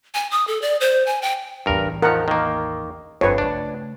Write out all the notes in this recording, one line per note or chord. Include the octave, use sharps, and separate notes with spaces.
G#5
D#6
A4
D5
C5
G#5
G5
A1 E2 G2 A#4
D#3 F3 A#4 F#5
D#3 A#3
G1 F2 B4 C#5
C#3 A3 D4